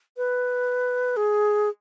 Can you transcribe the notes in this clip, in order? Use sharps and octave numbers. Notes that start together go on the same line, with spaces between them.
B4
G#4